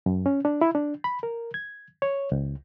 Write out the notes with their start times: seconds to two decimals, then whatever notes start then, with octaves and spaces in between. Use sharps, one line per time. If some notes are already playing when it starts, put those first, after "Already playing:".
0.06 F#2
0.26 C#4
0.45 D4
0.61 E4
0.75 D4
1.04 B5
1.23 A#4
1.54 G#6
2.02 C#5
2.32 C#2